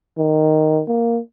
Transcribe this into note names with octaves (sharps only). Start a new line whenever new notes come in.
D#3
A#3